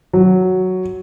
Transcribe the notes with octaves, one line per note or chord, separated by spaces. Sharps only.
F#3